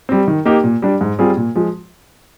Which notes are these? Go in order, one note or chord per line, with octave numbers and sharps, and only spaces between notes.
G3 C4
D#3
A#3 D#4 G4
A#2
G3 D4
G#2
G3 C4 F4 G#4
A#2
F3 G#3